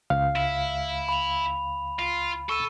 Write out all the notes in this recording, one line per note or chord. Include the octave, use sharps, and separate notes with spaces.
C#2 F5
E4
B5 F7
F4
A4 C#6 E6 D#7